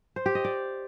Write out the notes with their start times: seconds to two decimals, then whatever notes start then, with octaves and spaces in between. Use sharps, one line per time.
0.16 C5
0.26 G4
0.35 D#5
0.45 D5